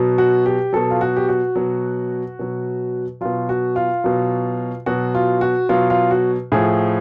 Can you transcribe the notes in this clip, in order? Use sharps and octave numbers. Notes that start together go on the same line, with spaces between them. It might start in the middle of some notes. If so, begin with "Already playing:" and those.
Already playing: B2 F#3
F#4
G4
B2 F#3 A4
F4
F#4
G4
F#4
B2 F#3
B2 F#3
B2 F#3 F4
F#4
F4
B2 F#3
B2 F#3 F#4
F4
F#4
B2 F#3 F4
F4
F#4
A2 F3 G#4